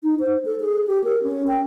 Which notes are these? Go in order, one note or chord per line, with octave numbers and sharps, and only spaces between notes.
D#4
C5
A4
G#4
G4
A#4
C#4
G5